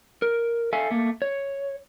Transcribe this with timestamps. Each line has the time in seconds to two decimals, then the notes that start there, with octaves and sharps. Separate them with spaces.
0.22 A#4
0.73 A4 E5 F5 G#5
0.91 A3 A#3
1.22 C#5